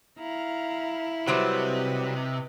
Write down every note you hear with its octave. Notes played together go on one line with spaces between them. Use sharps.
E4 F5 A#5
C3 F#3 G3 C4 B4 D#5